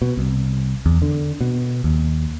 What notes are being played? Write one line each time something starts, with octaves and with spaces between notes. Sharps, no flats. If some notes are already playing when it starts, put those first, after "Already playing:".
B2
C2
E2
D3
B2
D#2